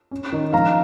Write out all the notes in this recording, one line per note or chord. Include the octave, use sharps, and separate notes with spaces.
C#4
D#3
F3 F5 A#5